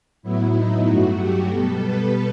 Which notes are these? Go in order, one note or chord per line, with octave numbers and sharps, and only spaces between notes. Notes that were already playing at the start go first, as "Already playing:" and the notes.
A2 F#3 B3 E4
D#4
G2 F#3 A3 F#4
G4
B2 G3 B3 A4
B4